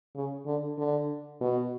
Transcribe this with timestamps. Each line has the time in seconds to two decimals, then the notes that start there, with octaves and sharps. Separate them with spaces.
0.15 C#3
0.46 D3
0.78 D3
1.41 B2